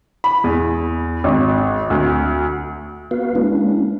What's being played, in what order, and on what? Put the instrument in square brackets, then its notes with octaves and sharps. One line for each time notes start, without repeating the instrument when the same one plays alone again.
[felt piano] B5
E2
G#1
D2
[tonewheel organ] B3 F#4 B4 F5
G#3 A#3 C#4 D4 E4